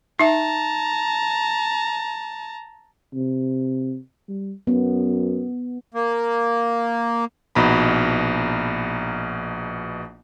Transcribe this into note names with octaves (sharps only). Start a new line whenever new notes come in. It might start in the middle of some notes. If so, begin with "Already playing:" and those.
D#4 E5 A5 A#5
C3
G3
F#2 B3
A#3
A#1 B2 D#4 A#5 B5